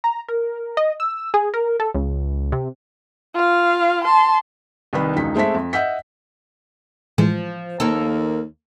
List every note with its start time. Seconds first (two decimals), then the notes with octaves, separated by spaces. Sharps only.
0.04 A#5
0.28 A#4
0.77 D#5
1.00 E6
1.34 G#4
1.54 A#4
1.80 A4
1.94 C#2
2.52 C3
3.35 F4 F5
4.04 A5 C6
4.93 C2 D#3 D#4 B4 B5
5.16 E1 C#2 D#4 B6
5.36 G#3 A3 C4 E5 B6
5.54 F2
5.73 D#5 E5 F#5 E6 G6 B6
7.18 A2 E3 F3 G#3
7.80 D#2 A#3 A4